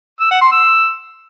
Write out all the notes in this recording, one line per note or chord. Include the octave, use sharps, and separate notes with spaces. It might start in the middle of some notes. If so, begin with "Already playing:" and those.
E6
F#5
C6
E6